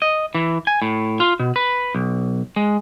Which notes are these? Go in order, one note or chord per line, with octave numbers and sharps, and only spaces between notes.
D#5
E3
G#5
A2
F4
B2
B4
B1
G#3